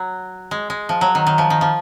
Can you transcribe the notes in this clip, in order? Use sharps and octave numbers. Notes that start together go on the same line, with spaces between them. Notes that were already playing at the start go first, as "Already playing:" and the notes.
Already playing: F#3
G#3
G#3
F3
F#3
D#3
D#3
F3
D#3
F3